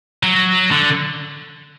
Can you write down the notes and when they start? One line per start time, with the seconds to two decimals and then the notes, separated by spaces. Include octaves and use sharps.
0.23 F#3
0.71 D3